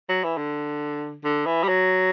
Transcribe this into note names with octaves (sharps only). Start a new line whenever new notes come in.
F#3
E3
D3
D3
E3
G3
F#3